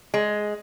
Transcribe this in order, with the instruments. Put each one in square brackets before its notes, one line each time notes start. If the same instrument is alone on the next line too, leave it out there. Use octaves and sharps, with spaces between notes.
[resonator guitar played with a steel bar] G#3